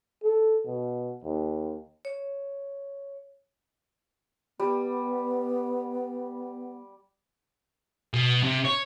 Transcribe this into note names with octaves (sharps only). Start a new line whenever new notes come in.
A4
B2
D#2
C#5
G3 B3
B2
C3
C#5